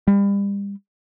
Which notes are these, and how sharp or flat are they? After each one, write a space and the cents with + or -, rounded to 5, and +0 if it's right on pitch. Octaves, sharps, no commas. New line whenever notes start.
G3 +35